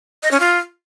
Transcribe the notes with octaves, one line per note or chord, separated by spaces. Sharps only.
D#5
C#4
F4